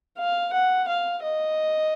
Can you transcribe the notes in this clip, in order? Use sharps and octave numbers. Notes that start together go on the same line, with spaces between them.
F5
F#5
F5
D#5